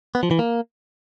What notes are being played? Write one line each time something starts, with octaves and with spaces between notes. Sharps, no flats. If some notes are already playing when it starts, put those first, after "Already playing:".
B3
F3
E3
A#3